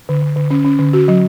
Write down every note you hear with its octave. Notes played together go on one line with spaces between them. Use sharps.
D3
D3
D3
C#4
C#4
D3
F#4
F#3